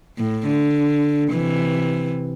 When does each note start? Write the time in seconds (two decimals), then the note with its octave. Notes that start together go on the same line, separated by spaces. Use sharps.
0.18 A2
0.46 D3
1.31 C3 E3